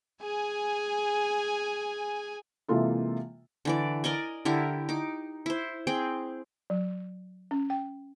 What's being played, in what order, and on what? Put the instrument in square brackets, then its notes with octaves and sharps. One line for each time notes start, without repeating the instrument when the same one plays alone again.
[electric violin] G#4 G#5
[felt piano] C3 E3 G#3 A#3 F4 A4
[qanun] D3 E3 D5
A#4 D5 D#5 G#5
D3 E4 G4 A#4
D#4 D6
E4 C5
C4 G#4 G5
[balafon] F#3
C#4
G5